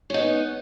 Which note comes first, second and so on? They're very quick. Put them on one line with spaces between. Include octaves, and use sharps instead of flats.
C#4 D#4 B3